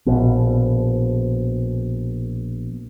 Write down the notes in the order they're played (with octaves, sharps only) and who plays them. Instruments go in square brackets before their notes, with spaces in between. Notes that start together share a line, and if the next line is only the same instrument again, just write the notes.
[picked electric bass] A#1 B2